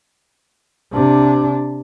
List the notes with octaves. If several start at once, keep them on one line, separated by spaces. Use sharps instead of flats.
C3 D4